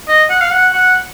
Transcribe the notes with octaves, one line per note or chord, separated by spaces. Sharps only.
D#5
F#5
F5
F#5
F#5